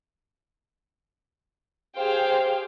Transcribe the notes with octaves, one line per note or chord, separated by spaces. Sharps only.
G4 G#4 C5 F5 G5